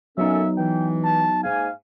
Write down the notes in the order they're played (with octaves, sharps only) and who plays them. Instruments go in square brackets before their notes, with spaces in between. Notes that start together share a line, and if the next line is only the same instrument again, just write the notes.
[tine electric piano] F#3 B3 D#4 [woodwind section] A#3 C#4 A4 [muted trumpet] E5
[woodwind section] E3 [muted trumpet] G5
[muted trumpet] A5
[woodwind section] G#2 A#3 G#5 [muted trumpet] F5